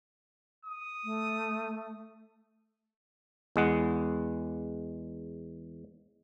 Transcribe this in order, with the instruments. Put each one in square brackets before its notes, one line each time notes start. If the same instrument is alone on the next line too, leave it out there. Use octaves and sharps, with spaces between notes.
[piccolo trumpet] D#6
[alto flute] A3
[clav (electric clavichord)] E2 G#3 F#5